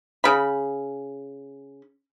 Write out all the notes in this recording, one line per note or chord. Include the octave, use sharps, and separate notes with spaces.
C#3 B5